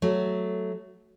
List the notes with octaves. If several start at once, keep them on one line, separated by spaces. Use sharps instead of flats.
F#3 A3